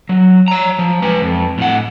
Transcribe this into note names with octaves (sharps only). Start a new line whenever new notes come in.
F#3
C#5 A#5
F3
G#3 B4
F2
A2 F#5